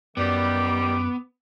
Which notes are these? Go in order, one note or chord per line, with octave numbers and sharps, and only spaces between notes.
F#2 D#3 G3 B3 D6